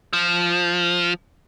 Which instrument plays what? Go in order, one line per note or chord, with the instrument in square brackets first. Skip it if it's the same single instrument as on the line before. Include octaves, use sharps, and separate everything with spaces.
[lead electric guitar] F3